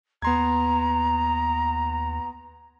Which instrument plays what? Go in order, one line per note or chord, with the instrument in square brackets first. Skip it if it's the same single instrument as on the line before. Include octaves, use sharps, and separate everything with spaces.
[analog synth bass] D#2 [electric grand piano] B3 C6 G#6 [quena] A#5